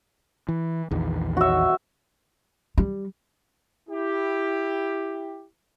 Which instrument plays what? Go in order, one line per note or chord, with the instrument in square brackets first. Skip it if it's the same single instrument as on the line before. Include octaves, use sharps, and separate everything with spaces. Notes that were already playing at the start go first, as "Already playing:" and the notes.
[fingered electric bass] E3
A#1 E2 D#3
[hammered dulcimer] F#4 E5
[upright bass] G3
[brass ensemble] E4 G4